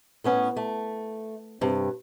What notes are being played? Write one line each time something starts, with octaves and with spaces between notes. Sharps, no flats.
A2 B3 C#4
A3
G2 C3